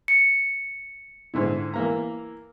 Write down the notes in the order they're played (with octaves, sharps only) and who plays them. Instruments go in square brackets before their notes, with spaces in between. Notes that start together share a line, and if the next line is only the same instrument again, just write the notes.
[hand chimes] C#7
[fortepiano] G#2 D3 E4
E3 A#3 A#5